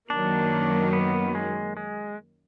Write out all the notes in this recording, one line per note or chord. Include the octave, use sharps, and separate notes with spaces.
F#2 D#3 F#3 A#3 D4
B3
G#3
G#3